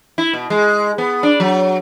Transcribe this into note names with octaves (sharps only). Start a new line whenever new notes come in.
E4
B2
G#3
B3
D4
F#3